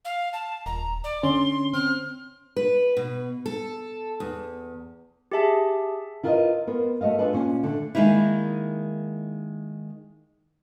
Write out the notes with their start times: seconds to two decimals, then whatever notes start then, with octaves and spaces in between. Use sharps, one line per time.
0.05 F5
0.33 A5
0.66 D#1 A#5
1.04 D5
1.23 D3 C#4 C6
1.74 C4 F6
2.56 B4
2.97 B2
3.46 A4
4.20 E2
5.32 G4 G#4 E5 A5
6.23 E4 F4 A#4 B4 D5 D#5
6.67 B3 A#4 C5
7.01 A3 F#4 A#4 D#5 F5
7.19 D4 F4 G#4 A4 B4
7.33 A#2 C#4
7.63 D3 A3
7.95 D#3 G#3 A#3 D#4 E4